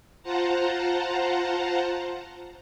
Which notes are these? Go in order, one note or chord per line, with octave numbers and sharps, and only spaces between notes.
F4 C5 F#5 A5 A#5